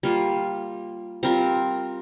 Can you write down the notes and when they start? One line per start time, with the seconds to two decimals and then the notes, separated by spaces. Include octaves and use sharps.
0.03 G3 A#3 F4
1.23 G3 C4 F4 A#4